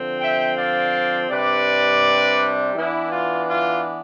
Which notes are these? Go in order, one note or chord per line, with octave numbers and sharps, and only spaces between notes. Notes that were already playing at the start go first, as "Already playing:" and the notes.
Already playing: D3 F3 C4
E5 G5
D5 F5
C3 G3 D4 B4 D5
E3 B3 D4 E4
F4
F4